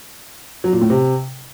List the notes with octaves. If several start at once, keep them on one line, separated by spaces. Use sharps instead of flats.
F#3
A#2
A2
C3